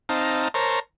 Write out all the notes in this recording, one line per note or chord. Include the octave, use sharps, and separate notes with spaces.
C4 D#4 F5 A5 A#5
A#4 C5 C#5 A5 A#5